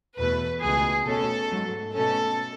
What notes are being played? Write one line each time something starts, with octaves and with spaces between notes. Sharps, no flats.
E2 B2 A3 B4
C#2 B2 A3 G#4
B2 A3 C#4 A4
G#2 F#3 A3
B2 A3 C#4 A4